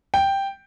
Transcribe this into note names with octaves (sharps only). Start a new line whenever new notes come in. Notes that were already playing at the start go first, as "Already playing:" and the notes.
G5